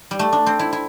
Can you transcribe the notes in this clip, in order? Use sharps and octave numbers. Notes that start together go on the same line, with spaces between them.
G3
A3
D4
C4
E4
E4